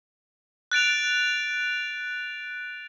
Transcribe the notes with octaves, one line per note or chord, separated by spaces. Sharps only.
F#6 A6 D7 F7